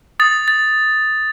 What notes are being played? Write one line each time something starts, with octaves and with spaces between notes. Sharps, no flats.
D#6 A6
A6